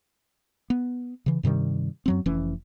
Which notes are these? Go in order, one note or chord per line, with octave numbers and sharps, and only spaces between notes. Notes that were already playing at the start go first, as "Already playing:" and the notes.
B3
C#3 E3
G2 C3 D#3 G3
F#2 F#3 C4
F1 E3 C#4